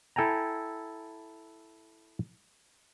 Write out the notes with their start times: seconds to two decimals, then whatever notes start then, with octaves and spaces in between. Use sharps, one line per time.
0.16 E4 A4 G5 G#5 A#5